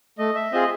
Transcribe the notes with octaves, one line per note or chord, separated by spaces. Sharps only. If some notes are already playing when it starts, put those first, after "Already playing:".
A3 D#5
E5
C4 F4 G#4 D#5